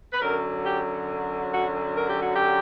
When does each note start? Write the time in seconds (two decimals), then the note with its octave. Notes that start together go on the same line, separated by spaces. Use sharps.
0.13 B4
0.21 F#2 D3 F#3 A#4
0.65 G4
1.52 F#4
1.97 A#4
2.09 G4
2.22 F#4
2.35 G4